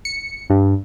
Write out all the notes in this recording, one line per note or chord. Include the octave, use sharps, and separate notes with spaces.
C#7
G2